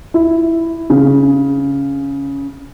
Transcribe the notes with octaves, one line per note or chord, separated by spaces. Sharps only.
E4
C#3